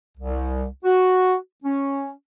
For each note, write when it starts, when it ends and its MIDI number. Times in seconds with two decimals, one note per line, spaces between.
0.18 0.65 36
0.85 1.35 66
1.64 2.09 61